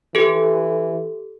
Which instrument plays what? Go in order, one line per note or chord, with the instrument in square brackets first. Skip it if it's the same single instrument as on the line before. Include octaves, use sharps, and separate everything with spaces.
[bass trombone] E3 [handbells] G4 A4